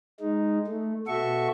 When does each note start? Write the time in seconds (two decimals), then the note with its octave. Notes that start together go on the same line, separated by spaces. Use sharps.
0.20 G#3 D#4
0.67 A3
1.07 B2 F#4 A4 E5 C#6